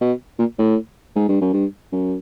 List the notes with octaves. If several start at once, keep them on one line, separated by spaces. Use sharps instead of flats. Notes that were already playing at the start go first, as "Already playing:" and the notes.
B2
A#2
A2
G#2
G2
F#2
G2
F#2